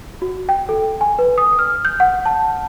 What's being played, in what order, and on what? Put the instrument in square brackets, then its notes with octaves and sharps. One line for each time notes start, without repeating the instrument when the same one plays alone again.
[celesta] F#4
G5
A4
G#5
B4
D#6
F6
G6
F#5
A5